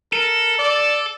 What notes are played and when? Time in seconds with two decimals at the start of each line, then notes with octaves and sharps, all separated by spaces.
0.13 A4 A#4
0.59 D5